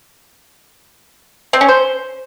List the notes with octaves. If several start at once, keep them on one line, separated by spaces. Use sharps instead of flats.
C4
C#4
C5